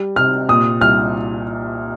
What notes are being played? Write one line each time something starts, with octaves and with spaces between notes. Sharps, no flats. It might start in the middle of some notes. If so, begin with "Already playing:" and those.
Already playing: G3
C3 F6
A#2 D#6
C2 F6